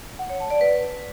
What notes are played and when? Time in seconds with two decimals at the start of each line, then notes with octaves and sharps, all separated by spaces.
0.19 F#5
0.30 C#5
0.40 A5
0.50 D5
0.61 B4